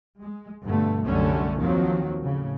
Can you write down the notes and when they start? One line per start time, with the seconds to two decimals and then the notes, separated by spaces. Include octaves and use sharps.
0.20 G#3
0.64 G2 B2 D3 A3
1.05 C2 F#2 D3 G3 A3 C#4
1.59 D#2 D#3 F3 F#3 C4
2.22 A2 C#3